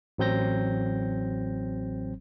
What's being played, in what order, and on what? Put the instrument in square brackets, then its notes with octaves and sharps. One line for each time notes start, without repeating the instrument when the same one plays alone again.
[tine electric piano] A1 F#3 C4 G6 A#6